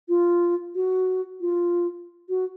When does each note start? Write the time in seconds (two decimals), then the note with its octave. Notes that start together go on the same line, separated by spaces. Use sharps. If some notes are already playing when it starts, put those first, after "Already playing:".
0.09 F4
0.75 F#4
1.41 F4
2.29 F#4